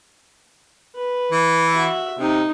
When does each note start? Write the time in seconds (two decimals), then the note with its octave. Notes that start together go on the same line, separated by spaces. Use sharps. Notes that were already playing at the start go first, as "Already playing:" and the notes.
0.96 B4
1.32 E3
1.69 F#4 E5
2.19 C3 D#4